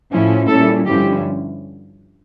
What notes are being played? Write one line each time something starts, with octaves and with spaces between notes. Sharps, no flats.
A2 F3 C#4 E4
A#2 G3 C#4 E4 A4
G2 D3 F3 C#4 E4 G4